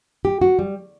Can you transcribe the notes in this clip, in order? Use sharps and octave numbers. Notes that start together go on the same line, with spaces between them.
G4
F#4
G3